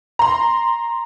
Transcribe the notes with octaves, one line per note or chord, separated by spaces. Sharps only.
A#5 C6